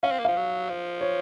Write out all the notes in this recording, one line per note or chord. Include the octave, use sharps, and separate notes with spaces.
C#4 F5
C4
A#3
F3 F5
F#3
F3
C#5